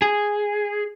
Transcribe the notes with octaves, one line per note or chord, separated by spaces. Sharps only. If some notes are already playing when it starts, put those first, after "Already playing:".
G#4